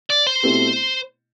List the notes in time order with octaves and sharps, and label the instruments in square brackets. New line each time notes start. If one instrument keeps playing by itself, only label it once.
[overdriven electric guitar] D5
C5
[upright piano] B2 A3 C4 E4 G4